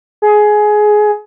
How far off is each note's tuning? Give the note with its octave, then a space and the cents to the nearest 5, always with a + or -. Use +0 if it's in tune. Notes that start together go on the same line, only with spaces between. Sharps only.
G#4 +15